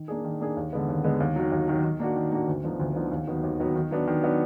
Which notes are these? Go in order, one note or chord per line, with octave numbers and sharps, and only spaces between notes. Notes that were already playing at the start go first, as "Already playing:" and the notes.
Already playing: D#3
A#3 D4 G#4
D#3
A#3 D4 G#4
D#2
D3 G#3 B3
D#2
D3 G#3 B3
D#2
D#3 F#3
D#2
D#3 F#3
D#3
A#3 D4 F#4
D#3
A#3 D4 F#4
D2
D3 F3 B3 D#4
D2
D3 F3 B3 D#4
D#2
D#3 F#3 B3
D#2
D#3 F#3 B3
D#3
F#3 B3 D4
D#3
F#3 B3 D4